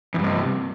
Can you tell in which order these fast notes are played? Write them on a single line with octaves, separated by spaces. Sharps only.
E2 G2 C3